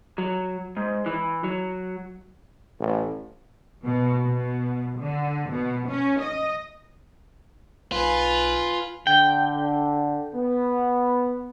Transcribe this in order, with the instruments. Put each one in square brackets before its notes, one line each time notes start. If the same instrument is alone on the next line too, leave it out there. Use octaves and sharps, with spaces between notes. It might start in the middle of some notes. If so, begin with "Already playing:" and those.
[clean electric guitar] F#3
G#2
E3
F#3
[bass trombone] A1
[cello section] B2
B2
D3
B2
C#4
D#5
[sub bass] B1 [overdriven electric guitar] F4 [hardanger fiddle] B4 G#5
[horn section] D3 [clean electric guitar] G5
[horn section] B3